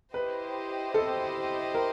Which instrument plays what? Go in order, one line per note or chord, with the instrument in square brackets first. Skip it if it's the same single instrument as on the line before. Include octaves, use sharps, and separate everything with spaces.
[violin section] E4 G4 C5 D#5 [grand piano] B4
[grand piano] A4
A#4